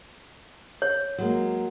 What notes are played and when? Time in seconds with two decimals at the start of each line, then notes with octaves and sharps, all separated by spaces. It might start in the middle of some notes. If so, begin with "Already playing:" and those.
0.82 C#5
1.18 F#3 G#3 A#3